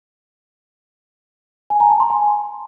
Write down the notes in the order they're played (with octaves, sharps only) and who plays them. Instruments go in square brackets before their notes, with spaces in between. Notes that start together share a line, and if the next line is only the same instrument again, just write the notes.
[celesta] G#5
A#5
A5
C6
G#5